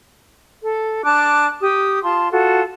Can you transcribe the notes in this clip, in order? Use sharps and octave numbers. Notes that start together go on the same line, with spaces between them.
A4
D4 A5 D6 F#6
G4 D#6
F4 A5 C6
F4 F#4 A4